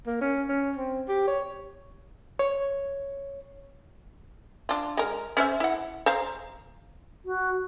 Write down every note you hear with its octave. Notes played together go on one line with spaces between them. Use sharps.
A#3
C#4
C#4
C4
G4
C#5
C#5
D4 F4
G#3 A#4
C#4 C5 E5
E4 F#5
C5 F5 A#5
F#4